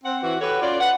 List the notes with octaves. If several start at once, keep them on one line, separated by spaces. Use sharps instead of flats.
C4 F#5
E3 F#4
F#4 G4 A4 B4 C#5
C#4 F4 D5
B4 F#5